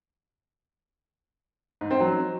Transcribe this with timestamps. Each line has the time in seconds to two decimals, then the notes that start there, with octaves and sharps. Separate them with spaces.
1.81 G#2
1.91 C4
2.00 F#3